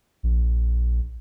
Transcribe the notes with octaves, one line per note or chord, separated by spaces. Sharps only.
A#1